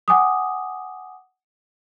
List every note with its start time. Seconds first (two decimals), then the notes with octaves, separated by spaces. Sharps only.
0.08 F#5 G#5 D6 D#6